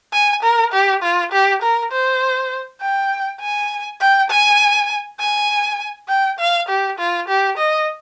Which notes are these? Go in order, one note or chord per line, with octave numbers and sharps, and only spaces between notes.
G#5
A#4
G4
F4
G4
A#4
C5
G5
G#5
G5
G#5
G#5
G5
F5
G4
F4
G4
D#5